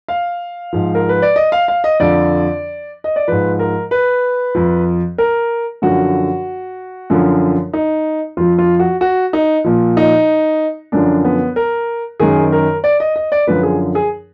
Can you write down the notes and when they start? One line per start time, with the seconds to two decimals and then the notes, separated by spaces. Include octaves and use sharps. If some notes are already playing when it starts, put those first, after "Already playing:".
0.08 F5
0.73 G#2 F3
0.95 A#4
1.09 B4
1.22 D5
1.36 D#5
1.52 F5
1.68 F5
1.84 D#5
2.00 F2 D3 F3 D5
3.04 D#5
3.16 D5
3.28 G#2 F3 B4
3.59 A#4
3.91 B4
4.55 F2 F3
5.18 A#4
5.82 F#2 D3 F3 F#4
7.10 F#2 D3 F3
7.73 D#4
8.37 F2 F3 F4
8.59 F4
8.79 F#4
9.01 F#4
9.33 D#4
9.65 A#2 F3
9.97 D#4
10.92 F#2 D3 F3 D4
11.24 B3
11.56 A#4
12.20 F#2 D#3 G#4
12.52 A#4
12.84 D5
13.00 D#5
13.16 D#5
13.32 D5
13.47 F#2 D3 F3 B4
13.63 G#4
13.95 G#4